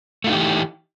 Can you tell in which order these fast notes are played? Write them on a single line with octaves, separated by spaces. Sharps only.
A3 F4 D#4 G4 E3